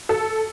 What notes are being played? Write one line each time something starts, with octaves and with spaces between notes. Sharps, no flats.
A4